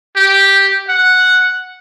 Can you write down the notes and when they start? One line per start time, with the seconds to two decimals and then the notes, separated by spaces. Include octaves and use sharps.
0.16 G4
0.89 F#5